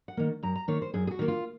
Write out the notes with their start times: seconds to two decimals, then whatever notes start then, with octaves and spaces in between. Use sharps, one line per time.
0.08 F#5
0.17 D#3 A#3
0.43 F#2 A#5
0.56 A#5
0.68 D#3 A#3 C#5
0.82 C5
0.94 F#2 G#4
1.07 G#4
1.11 F#4
1.19 D#3 A#3
1.28 F4